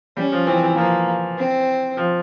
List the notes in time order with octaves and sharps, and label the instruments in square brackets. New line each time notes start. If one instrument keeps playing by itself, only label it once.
[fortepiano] G3 [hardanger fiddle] C#4
[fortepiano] F3
[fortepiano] E3 [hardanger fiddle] C4
[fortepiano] E3
[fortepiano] F3 [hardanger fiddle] A#3
[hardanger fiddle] C4
[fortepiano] F3